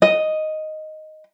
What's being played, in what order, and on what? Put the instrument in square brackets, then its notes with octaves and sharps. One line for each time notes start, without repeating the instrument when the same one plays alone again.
[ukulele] D#5